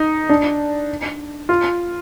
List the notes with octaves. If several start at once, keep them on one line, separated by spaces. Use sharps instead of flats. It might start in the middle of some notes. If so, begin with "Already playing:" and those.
Already playing: D#4
D4
F4